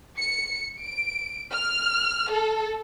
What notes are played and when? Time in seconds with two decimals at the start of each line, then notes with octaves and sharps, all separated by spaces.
0.18 C#7
0.81 D7
1.52 F6
2.32 A4